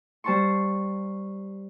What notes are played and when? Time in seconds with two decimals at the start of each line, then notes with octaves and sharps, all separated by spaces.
0.24 G3 C5 A5 C6 C#6